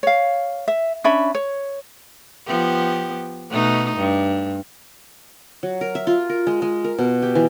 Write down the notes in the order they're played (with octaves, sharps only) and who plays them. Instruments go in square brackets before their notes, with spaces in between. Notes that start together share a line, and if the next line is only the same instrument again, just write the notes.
[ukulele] C#5 F5
E5
C#4 D4 E5 B5
C#5
[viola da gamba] F3 B3 G4
B2 A3 D#4
G2
[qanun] F#3
A#4
E5
F4
A#4
G#3
G#3
A#4
B2
G4
E3